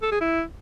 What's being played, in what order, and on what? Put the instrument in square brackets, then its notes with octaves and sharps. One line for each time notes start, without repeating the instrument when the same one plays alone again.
[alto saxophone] A4
G#4
E4